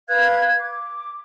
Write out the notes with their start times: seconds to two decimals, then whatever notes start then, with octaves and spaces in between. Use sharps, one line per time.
0.08 B4 F5 F#6 G#6
0.59 D6